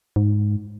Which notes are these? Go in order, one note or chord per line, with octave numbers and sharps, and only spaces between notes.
G#2